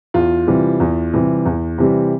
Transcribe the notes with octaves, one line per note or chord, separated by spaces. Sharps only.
E2 F4
C3 E3 G3
E2
C3 E3 G3
E2
C3 E3 G3